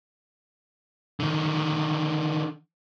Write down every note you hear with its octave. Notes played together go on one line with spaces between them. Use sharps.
D3 D#3